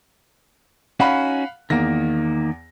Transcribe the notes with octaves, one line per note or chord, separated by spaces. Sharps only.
C#4 D#4 F#4 F5 F#5 B5
E2 D#3 A#3 A#6